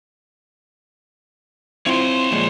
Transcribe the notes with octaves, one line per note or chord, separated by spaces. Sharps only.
C4 E4 F4 C#5 C6
A#2 F3 G#3